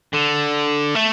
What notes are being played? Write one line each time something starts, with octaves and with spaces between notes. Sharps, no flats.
D3
A3